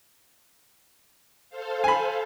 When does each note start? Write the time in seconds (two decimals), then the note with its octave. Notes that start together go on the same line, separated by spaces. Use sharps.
1.50 A4 C5 F5
1.84 G#5 B5